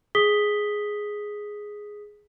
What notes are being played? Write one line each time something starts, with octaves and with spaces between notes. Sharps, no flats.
G#4 D#6 B6 G7